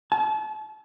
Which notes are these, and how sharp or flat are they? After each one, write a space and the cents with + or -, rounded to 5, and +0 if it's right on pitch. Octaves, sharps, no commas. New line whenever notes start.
A5 -35